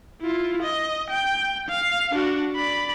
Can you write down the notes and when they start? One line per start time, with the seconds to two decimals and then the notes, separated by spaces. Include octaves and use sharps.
0.22 E4 F4
0.63 D#5
1.10 G5
1.69 F5
2.12 D4 F#4
2.56 D5 B5